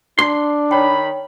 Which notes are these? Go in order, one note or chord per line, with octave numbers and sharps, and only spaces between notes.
D4 C6
D#3 C#5 G5 B5